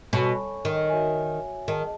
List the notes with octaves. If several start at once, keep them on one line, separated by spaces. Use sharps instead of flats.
B2 A4 C#5 G#5 C#6
D#3
F#4 C#5 E5 G#5
D#3 G#4 D#5 A5